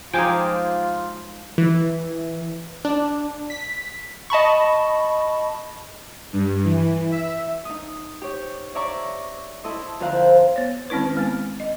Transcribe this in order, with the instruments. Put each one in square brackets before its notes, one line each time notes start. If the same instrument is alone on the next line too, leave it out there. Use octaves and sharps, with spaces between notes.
[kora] F3 G#3 D#4 [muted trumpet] F4 [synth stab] G5 G#5 D6
[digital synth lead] E3
D4
B6
[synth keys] D#5 A5 B5 C#6
[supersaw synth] G2
E3
E5
[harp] D#4 D#6
G4 C#5
C#5 D5 E5 A#5 C#6 D6
E4 A4 D#5 C6
F2 D3 A#4 C5 F5 F#6
[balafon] B3 C#5
D#3 G#3 C4 C#4 E4 B4
G#3 B3
D#5